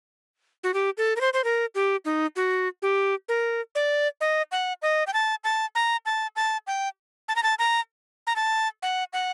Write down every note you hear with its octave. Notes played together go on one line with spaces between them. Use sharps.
F#4
G4
A4
A#4
C5
C5
A#4
G4
D#4
F#4
G4
A#4
D5
D#5
F#5
D#5
G5
A5
A5
A#5
A5
A5
G5
A5
A#5
A5
A#5
A#5
A5
F#5
F#5